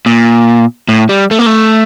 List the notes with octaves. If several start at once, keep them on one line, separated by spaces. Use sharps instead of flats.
A#2
A2
G3
A3
A#3
A3